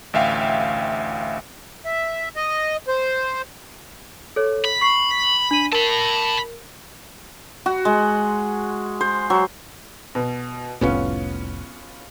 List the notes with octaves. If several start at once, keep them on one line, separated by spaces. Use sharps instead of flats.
A1 D2 E5 F5 G5
E5
D#5
C5
A4 C#5
B5
C#6 C7
D4 D#7
A#4 A5 B5
F#4
G#3
C5
F#3
B2
F1 C2 A2 B3 C#4 F4